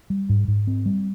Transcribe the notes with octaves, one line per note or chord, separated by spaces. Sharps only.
G3
G#2
G#2
C4
G3